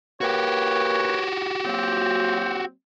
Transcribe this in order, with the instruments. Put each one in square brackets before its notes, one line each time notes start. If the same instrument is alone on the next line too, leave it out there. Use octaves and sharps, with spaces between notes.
[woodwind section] A#3 B4 C#5 [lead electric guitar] F#4 G4
[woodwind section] F#3 A#3 C4